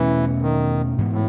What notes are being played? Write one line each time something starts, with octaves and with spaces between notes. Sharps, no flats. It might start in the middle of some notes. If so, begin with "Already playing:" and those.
Already playing: E2 B2 E3 A3 C#4
D#3
G#2 E3 B3
A2